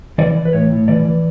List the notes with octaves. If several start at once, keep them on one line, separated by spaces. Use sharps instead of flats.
E3 D5
E3
B4
A2 C#5
A2
E3 D5
E3